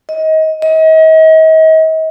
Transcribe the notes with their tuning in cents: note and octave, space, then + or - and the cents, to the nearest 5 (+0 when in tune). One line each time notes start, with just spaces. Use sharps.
D#5 +25
D#5 +40